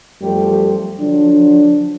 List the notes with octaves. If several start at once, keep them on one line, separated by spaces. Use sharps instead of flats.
F#2 F3 G3 A3 G4 A4
D3 F3 F#3 D4